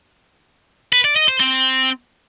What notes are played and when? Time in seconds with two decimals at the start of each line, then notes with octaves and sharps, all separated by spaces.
0.93 B4
1.05 D5
1.16 D#5
1.28 C5
1.40 C4